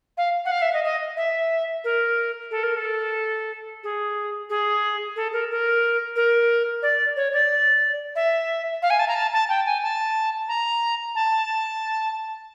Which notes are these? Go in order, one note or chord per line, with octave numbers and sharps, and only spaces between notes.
F5
F#5
F5
E5
D#5
D#5
E5
A#4
A4
A#4
A4
G#4
G#4
A4
A#4
A#4
A#4
D5
C#5
D5
E5
F5
G#5
A5
A#5
A5
A5
G5
G#5
A5
A#5
A5